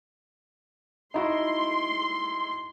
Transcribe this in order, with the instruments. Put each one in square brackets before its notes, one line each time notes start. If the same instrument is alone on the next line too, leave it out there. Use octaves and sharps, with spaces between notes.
[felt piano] D#4 E4 F#4 [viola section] C6